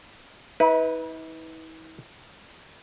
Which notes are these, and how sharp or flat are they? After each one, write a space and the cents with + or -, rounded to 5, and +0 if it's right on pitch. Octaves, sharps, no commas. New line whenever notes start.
E4 -45 B4 +0